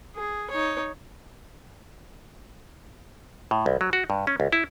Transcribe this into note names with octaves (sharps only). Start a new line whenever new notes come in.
G#4
D#4 C#5
A2
C2
F#3
F#4
G2
C#4
C#2
E4